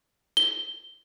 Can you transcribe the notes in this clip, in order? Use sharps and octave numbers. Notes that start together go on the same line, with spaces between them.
G7